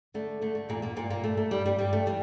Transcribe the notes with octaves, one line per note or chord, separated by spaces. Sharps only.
D3 A3
D3 A3
A3
E2 A#2 A#3
A#2 A#3
G2 A#2 A#3
A#2 A#3
G2 A3
A3
G2 G3
G3
G2 G3
A3
E3 G3